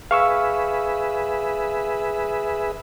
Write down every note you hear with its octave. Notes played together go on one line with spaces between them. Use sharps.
G#4 B4 E5 F5 C#6 E6